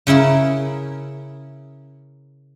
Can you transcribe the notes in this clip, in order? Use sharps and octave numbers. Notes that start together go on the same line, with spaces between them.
C#3 C#4 E4 A#4